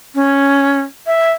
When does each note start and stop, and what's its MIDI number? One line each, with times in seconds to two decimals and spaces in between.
0.15 0.80 61
1.07 1.31 76